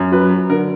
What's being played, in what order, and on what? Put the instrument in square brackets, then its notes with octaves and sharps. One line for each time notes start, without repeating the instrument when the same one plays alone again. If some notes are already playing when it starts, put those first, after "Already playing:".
Already playing: [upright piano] F#2
F#3 B4
F#3
D3 A#4